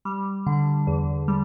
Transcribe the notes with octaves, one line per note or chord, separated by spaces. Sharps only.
G3
D3
E2
G3